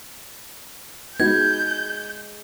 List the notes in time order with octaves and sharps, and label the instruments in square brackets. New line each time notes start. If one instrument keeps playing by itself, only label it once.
[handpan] G#3 B4 [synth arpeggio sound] B3 D#4 F#4 [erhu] G6 [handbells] G#6